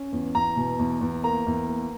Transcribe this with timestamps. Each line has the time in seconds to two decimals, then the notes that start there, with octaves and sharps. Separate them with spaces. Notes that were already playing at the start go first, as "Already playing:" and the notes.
Already playing: C#4
0.12 E2
0.35 E2 A#5
0.57 B2
0.79 E2
1.01 E2
1.24 A#3 A#5
1.47 E2
1.68 A#3